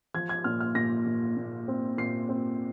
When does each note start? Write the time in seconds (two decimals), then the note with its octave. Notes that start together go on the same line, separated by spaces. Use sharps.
0.14 F3 G#6
0.29 G#6
0.44 A#2 F6
0.60 F6
0.75 A#2 A#6
1.06 A#2
1.37 A#2
1.68 C4
1.98 A#2 C7
2.29 C4